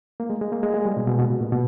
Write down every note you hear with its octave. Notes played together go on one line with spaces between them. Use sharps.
A#3
G#3
G#3
A#3
G#3
G#3
G3
B2
B2
B2
B2
A#2
B2